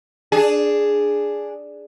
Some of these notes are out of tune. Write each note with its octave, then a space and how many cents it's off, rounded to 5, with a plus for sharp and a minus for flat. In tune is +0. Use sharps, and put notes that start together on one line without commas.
D4 +0 G#4 +0